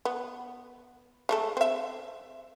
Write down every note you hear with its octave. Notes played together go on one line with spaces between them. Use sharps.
B3
G#3 A3 A4
C4 E5